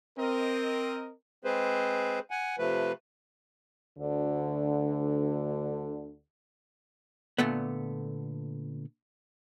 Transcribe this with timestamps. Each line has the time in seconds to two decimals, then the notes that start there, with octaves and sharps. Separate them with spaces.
0.17 C4 A#4 D#5
1.44 G#3 C4 G#4 B4 C5
2.30 F#5 G#5
2.58 C3 F3 A3 B4
3.98 D2 D3
7.38 A#2 D3 A3 B3